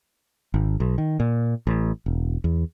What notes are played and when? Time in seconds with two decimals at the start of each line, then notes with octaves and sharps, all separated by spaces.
0.54 G#1
0.80 B1
0.98 D#3
1.20 A#2
1.67 A1
2.06 E1
2.44 E2